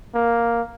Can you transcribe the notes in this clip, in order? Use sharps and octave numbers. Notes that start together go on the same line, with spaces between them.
A#3